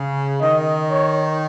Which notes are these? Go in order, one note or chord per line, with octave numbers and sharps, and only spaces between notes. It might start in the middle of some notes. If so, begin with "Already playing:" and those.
Already playing: C#3
D#3 D#5
C#5